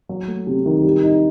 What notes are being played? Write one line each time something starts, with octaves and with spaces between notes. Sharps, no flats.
F#3
A3
C3
D#3
G3
D#4